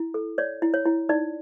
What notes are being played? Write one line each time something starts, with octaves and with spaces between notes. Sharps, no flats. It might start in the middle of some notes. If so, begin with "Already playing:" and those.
Already playing: E4
A4
C#5 D5
E4
C#5
E4
D#4 D5